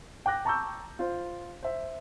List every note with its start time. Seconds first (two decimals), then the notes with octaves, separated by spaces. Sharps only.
0.26 G5 D6 F#6 A#6
0.45 A5 A#5 C#6 D6 E6 G6
0.99 F4 C5
1.63 C5 E5